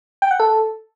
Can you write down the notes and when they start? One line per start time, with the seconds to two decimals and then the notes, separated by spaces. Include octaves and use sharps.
0.22 G5
0.31 F#5
0.40 A4